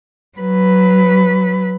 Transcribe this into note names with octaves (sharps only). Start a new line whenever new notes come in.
F#3 B4